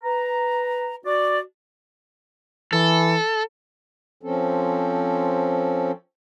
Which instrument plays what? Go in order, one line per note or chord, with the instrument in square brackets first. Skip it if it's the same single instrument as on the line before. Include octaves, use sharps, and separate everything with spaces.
[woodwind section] B4 A#5
F#4 D5
[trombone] E3 [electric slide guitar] A4
[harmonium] F3 C4 C#4 A4